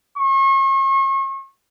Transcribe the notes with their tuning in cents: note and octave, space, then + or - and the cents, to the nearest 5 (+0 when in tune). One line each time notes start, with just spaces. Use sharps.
C#6 -40